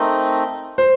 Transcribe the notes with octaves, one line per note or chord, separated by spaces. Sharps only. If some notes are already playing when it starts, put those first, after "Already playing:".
Already playing: A3 C4 D#4 A#4
C5